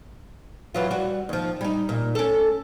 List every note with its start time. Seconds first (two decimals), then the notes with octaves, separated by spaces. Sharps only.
0.75 E3 F#3 F4
0.91 G3 F#4
1.29 D#2 F3
1.61 G3 D#4
1.89 A#2
2.15 C#4 A4